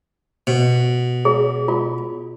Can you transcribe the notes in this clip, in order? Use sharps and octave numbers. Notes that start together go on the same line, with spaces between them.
B2
G#4
F4